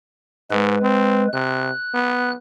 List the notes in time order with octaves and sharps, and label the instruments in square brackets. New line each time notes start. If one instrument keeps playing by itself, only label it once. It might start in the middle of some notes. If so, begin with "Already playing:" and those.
[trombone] G#2 [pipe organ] G#3 B4
[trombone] C4
[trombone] C3 [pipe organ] F#6
[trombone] B3